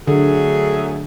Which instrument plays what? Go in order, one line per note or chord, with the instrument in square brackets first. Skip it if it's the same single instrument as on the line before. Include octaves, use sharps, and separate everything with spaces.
[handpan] D3 [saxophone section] F#3 A3 G#4